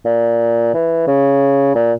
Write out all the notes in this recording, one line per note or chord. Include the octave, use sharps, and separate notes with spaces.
A#2
E3
C#3
A#2